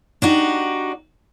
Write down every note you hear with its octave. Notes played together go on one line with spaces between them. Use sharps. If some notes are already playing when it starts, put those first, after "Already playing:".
D4 D#4 F#4 G4